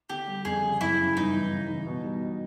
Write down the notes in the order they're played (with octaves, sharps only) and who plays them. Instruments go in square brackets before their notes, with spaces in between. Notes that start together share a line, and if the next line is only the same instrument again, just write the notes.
[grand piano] D3 [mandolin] G4
[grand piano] G3
[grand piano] F2 [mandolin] G#4
[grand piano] C#3
[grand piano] F#2 [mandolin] E4
[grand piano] C#3
[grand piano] G2 [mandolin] D#4
[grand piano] E3
C#3
E3
B2
G3